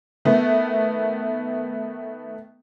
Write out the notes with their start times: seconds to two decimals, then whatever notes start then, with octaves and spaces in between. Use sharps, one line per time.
0.25 D#3 A3 B3